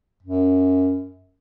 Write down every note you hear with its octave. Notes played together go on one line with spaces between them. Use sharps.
F#2